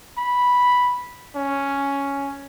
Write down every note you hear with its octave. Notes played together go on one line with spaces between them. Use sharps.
B5
C#4